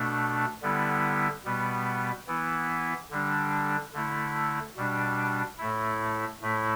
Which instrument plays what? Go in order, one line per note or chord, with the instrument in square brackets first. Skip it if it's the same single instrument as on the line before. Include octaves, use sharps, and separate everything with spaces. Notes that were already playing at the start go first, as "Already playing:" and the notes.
Already playing: [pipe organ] B2 A3 D4
D3 G3 B3 E4
B2 G3 B3
E3 B3 E4
D3 G3 D4
D3 A3 E4
B2 G3 D4
A2 A3 E4
A2 A3 E4